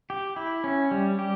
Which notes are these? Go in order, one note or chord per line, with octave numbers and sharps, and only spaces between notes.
G4
E4
C#4
G3
G4